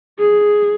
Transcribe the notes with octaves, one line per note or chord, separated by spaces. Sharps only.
G#4